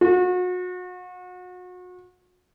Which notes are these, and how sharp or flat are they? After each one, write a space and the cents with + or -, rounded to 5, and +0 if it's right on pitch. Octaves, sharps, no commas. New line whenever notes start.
F#4 -35